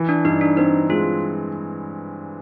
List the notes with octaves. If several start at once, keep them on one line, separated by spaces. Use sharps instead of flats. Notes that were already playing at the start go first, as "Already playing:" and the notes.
Already playing: E3
D4
G2 D#4
D4
C4 D#4
G#3 F4